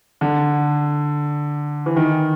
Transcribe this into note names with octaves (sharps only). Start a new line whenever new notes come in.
D3
E3
D#3